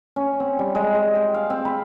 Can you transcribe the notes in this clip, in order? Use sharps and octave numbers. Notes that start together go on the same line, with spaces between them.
C#4
C4
G3
G#3
G#3
G5
F5
C4
B5